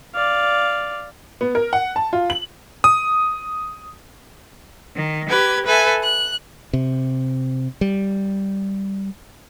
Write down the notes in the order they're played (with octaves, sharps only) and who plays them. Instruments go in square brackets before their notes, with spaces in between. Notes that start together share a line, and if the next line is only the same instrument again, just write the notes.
[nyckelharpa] D5 F5
[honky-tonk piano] B3
A#4
F#5
A5
F4
F#7
[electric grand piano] D#6
[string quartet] D#3
G4 B4 G#6
A4 B4 E5 G#5
F#6
[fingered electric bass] C3
G3